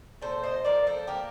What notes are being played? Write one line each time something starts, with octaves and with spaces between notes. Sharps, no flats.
A#2 A4 C5
C5 D#5
F3 A#4 D5
A4 C5
A#3 G4 A#4